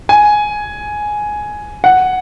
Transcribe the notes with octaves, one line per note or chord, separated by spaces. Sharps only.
G#5
F#5